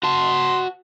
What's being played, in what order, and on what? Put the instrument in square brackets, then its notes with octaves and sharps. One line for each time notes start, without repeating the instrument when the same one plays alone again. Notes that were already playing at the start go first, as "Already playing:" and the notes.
[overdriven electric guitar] F#4 A5 [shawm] C6